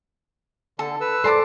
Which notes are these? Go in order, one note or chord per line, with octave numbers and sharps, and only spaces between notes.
D3 A4
B4 E6
A4 A#4 C5 D5 A5 D6